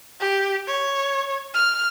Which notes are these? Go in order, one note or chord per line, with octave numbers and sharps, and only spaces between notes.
G4
C#5
F6